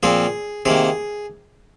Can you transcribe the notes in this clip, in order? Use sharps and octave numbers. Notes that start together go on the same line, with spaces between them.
A#2 F3 C4 G#4
C3 D#3 A#3 G#4